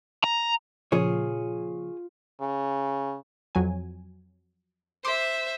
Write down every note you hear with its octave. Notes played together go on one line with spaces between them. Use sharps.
A#5
A#2 C#3 F3 F4 G#4 C#5
C#3
F2 F#3 G#5
C5 E5 C6 D6